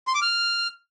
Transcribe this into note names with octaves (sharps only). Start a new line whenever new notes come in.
C6
D6
F6